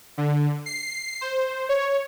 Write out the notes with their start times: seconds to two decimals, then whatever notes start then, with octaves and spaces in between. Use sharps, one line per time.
0.18 D3
0.66 C7
1.21 C5
1.69 C#5